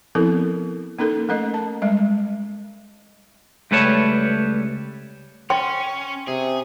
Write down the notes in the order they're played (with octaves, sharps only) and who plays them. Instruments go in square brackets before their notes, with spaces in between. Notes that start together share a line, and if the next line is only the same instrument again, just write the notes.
[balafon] F3 B3 C4 E4 A4 A#4
A#3 C#4 D#4 A4 A#4
A3 C#4 A#4 D#5
A5
G3 G#3 D#5
[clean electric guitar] C#2 G3 A3 B4 C#5 A5
[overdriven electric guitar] C#4 [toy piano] G5 C6
[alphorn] C3 [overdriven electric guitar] G#4